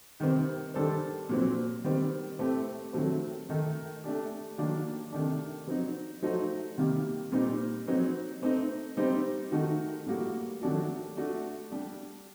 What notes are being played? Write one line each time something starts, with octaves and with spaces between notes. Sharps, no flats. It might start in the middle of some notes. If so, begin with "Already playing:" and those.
C3 D#3 G3 C4
D#3 G3 D4 A4 C5
A#2 F#3 C4
D#3 G3 C4
A2 A3 C4 G4
D#3 F#3 A3 C4
D#3 A3 D#4
A3 D4 G4
D#3 F#3 A#3 D4
C3 D#3 A3 D4
F#3 C4 D#4
F#3 A3 D#4 F#4 C5
C3 D#3 G3 A#3
A#2 G3 C4 D#4
F#3 C4 D#4
A3 C4 D#4
G3 C4 D#4 G4 C5
D#3 A3 D#4 F#4
A2 G3 A#3 F#4
D#3 F#3 A3 D4 F#4
A3 D4 F#4
G3 D4 G4